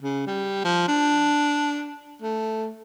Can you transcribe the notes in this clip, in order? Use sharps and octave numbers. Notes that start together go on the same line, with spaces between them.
C#3
G3
F3
D4
A3